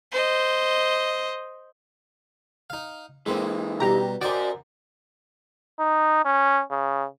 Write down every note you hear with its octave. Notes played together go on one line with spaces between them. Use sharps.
C5 D#5
D#4 F5
C#3 E3 G#3 A#3 C4
B2 G3 G4 A#5
F#4 A#4 C5 D5 D#5 G5
D#4
C#4
C#3